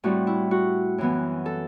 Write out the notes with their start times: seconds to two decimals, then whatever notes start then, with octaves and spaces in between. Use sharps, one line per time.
0.04 A2 G3 C4 F#4
0.27 E4
0.51 F#4
0.98 F#2 E3 B3
1.46 A4